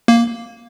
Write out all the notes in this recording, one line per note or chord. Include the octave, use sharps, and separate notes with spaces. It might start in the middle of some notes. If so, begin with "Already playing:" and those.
A#3